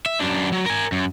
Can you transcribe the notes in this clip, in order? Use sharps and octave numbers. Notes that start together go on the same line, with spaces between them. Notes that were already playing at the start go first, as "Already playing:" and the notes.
E5
F#2 D4
F#3
A#4 G#5
F#2